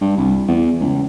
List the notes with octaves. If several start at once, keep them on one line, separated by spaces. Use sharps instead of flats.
G2
C2
E2
C#2